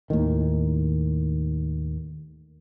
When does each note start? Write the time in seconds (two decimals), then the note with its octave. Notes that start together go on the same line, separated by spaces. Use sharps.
0.10 D#2 A2 D#3